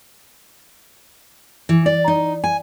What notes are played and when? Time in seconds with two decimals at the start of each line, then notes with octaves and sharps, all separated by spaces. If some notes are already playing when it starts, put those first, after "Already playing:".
1.69 E3
1.86 D5
2.08 D#4
2.44 G#5